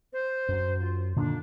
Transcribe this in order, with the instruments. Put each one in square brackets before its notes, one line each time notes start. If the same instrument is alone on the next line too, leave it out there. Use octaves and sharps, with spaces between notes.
[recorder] C5
[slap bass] F#2
[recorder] F4
[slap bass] A#2 D3 D#3 [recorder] D4